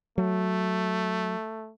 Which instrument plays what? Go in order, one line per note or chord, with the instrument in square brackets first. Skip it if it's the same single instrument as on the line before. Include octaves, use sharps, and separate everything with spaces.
[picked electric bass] F#3 [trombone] A3